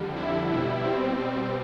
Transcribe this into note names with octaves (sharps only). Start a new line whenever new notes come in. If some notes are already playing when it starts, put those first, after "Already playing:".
Already playing: F2 D3 G3
E4
B2 G3
C4
B2 G3 C4